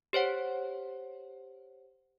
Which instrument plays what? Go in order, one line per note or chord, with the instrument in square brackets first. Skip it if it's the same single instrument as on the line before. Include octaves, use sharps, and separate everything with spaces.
[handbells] G4 C5 C#5 F#5